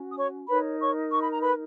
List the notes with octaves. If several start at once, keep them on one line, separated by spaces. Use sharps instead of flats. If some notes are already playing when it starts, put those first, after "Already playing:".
Already playing: C#4 F#4
D#6
C#5 C#6
D#4 A#4 B4 C#5 B5
C#5 C#6
C#6
B5
A#5
B4 B5